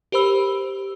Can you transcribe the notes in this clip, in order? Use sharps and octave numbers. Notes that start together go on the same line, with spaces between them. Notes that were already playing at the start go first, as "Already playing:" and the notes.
G4 A#4 C5 B5 E6